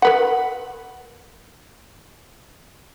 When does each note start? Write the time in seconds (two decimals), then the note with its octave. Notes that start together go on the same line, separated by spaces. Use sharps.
0.02 A#4 B4 F#5